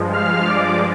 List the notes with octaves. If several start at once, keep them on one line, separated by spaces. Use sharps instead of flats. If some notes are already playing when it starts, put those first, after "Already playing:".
Already playing: G2 F3 G#3
F5 F6
D5 D6